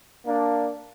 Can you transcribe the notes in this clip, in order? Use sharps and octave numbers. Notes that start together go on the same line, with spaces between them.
A#3 D4